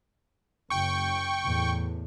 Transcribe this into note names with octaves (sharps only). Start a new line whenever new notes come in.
F#1 G5 C#6
E2 A2